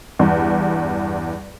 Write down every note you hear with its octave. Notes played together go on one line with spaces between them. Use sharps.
E2 G2